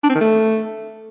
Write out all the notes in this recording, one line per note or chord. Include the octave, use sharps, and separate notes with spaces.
D4
C4
D#3
A3